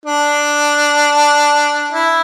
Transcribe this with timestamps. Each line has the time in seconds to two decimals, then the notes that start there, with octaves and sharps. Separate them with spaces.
0.05 D4
1.93 E4